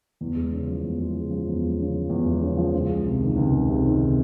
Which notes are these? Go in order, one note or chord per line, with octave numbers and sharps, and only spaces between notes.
E2
G#3
C#3
F3
E2
G#3
C#3
F3
E2
G#3
C#3
F3
E2
G#3
C#3
F3
C#2
G#3
C3
D#3
C#2
G#3
C3
D#3